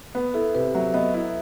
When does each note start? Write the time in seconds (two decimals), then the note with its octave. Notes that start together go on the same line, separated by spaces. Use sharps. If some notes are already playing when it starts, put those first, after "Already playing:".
0.15 B3 B4
0.34 E4 A4
0.55 C3 B4
0.75 F#3 E5
0.94 B3 D#5
1.14 E4